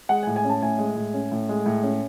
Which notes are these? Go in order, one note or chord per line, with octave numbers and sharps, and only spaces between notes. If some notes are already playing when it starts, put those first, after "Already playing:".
G#3 F#5
A2 G#5
G#5
C#4 A5
A2 G#5
G#3
A2
C#4
A2
G#3
A2
C#4